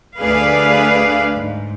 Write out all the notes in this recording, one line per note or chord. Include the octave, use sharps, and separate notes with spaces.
D2 D4 G#4 B4 D5 F5
G#2